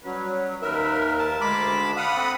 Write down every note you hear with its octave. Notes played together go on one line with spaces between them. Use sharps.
F#3 G3 C#4 B4
D#2 D#4 A#4 B4 E5
A5
D2 G#3 A5 B5 D6
F5 F#5 B5 D#6
C4 A4